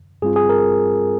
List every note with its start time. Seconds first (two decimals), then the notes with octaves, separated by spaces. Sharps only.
0.22 G2 G3 C4 F4 G#4
0.36 G#4
0.49 A#4